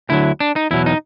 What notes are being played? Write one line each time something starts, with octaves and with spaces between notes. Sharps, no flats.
D2 D3 F#3 E4
D4
D#4
E2 B2 F#3 E4
D#4